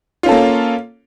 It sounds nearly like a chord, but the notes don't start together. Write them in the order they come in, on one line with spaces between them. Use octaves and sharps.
F4 C#4 A4 A#3